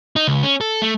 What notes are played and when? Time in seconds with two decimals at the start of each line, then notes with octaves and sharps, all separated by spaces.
0.16 D#4
0.28 C#2
0.43 C#4
0.61 A4
0.82 A3